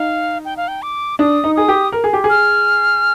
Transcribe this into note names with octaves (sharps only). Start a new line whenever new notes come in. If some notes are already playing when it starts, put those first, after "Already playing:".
Already playing: D#4 F5
G5
F5
G5
D6
D4 D#6
D#4
G#4 D#6
G4
A#4
G#4
G4
G#4
F6